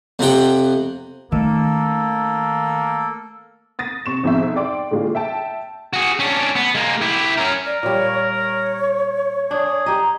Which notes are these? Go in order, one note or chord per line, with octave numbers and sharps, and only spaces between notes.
F2 C3 F#5 G5
D#3 A3 A#3 C#4 A4
D#6 A6 A#6 D#7
C3 C#6 E7
F2 G#2 B2 E5
D5 G5 C6 D6
A2 D3 G#3 A#3 F4
E5 G5 A5
F#4 G#4
C#4 D4
B3
G#3 A#3
E4 G4
C#4 A#4
A#4 D5
A#2 G3 C#5
C#5
D4 G#4
G4 D#5 A#5